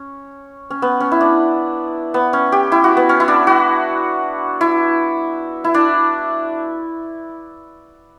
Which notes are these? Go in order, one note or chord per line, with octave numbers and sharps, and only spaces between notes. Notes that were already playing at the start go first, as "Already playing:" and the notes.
Already playing: C#4
C#4
B3
C#4
E4
D4
B3
C#4
G4
E4
F#4
B3
C#4
E4
D4
F#4
E4
E4
D4